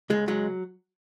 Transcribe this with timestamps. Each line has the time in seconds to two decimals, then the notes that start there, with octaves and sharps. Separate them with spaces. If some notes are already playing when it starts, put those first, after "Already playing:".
0.10 C#2 G#3
0.28 F#3 G#3